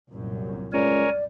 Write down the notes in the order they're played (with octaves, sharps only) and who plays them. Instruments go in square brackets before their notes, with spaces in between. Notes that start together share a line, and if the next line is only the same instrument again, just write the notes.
[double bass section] C2 F#2 A#2
[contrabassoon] C#2 [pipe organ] A#4 C#5 G#5 [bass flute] D5